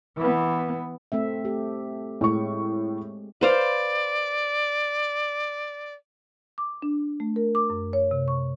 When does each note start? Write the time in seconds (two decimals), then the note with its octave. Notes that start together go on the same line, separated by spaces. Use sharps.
0.17 E3 B3
1.12 A3 C4 E5
1.45 G4 A4
2.21 A2 G#3 C#6
3.41 B4 C5 D5 F5
6.58 D6
6.82 D4
7.20 A3
7.36 A#4
7.55 D6
7.70 F#2
7.93 C#5
8.11 C3
8.28 C#6